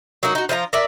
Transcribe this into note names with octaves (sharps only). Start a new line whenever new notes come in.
F#3 A#3 D#4 F#4
D#4 F#4
F3 F4 D#5 A#5
A#4 D5 E5